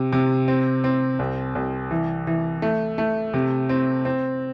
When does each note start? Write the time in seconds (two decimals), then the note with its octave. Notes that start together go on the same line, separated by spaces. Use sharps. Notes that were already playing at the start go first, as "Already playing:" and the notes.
Already playing: C3
0.13 C3
0.48 C4
0.84 C4
1.19 C2
1.55 C2
1.91 E3
2.27 E3
2.62 A3
2.98 A3
3.34 C3
3.69 C4
4.05 C4